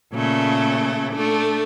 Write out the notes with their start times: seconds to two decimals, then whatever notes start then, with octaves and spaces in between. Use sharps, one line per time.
0.13 A#2 C#3 A3
1.14 A3 D4